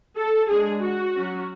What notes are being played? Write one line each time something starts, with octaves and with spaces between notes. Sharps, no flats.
A4
G#3 D4 G#4
F#4
F#3 C#4